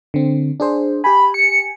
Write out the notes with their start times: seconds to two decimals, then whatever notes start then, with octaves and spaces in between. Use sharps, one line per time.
0.14 D3 C4
0.60 D4 G#4 C5
1.04 G4 G5 G#5 B5
1.34 C#7